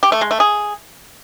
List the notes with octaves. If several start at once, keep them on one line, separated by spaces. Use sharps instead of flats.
G4
A3
G#3
A3
G#4